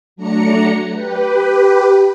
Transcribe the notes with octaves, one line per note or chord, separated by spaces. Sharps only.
F#3 A3 D4 A#5 C#7
G4 B4